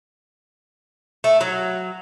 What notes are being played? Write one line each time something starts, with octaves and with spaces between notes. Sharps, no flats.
A3
F#3